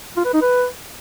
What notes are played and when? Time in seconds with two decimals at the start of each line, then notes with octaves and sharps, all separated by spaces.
0.17 F4
0.25 B4
0.34 D#4
0.42 B4